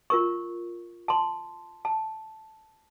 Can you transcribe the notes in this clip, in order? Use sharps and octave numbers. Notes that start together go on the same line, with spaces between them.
F4 A#4 C#6
A5 C6
A5